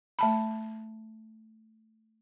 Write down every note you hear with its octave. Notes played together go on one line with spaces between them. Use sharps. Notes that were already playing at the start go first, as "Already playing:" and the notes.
A3 A5 B5